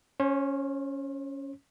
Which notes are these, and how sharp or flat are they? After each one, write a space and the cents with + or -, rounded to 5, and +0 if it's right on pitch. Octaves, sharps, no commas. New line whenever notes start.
C#4 +0 C5 +45